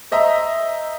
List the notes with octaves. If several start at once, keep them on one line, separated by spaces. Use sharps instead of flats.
C5 D#5 E5 A#5